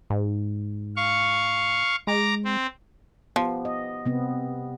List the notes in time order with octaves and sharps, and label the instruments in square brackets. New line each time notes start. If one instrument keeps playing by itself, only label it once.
[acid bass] G#2
[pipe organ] F5 C#6
[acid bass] G#3 [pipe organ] A#5 D6
[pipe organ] C4
[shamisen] F3 [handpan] B3 G4
[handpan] D#5
C3 B3 C4